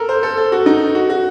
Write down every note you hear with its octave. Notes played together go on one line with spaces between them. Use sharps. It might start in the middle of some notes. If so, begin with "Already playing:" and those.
Already playing: A4 A#4
C5
A4
A4
F#4
D#4
F#4
F#4